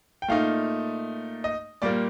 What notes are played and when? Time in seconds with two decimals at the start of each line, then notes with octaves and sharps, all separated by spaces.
0.22 G5
0.28 A#2 A3 D#4 F5
1.44 D#5
1.82 A#2 G3 A#3 D5